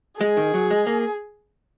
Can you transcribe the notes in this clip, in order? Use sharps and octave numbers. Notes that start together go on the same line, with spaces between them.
G#3 G#4
D#3
F#3
G#3
A#3